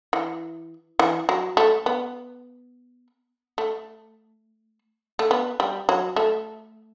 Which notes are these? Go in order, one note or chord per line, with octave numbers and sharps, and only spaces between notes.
E3
E3
F#3
A3
B3
A3
A3
B3
G3
F#3
A3